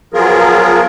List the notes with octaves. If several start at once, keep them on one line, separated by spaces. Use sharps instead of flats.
F3 F#3 B3 F4 G#4 A#4